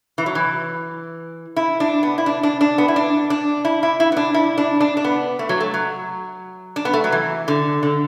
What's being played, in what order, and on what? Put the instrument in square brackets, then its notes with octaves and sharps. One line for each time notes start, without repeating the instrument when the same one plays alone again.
[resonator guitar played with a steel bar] E3
F#3
E3
E4
D4
B3
E4
D4
D4
D4
B3
E4
D4
D4
E4
E4
E4
B3
D4
E4
D4
D4
D4
B3
A3
F#3
A3
F#3
D4
B3
A3
F#3
E3
D3
D3